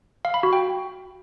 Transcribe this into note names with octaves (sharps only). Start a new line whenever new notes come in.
F5
B5
F#4
G5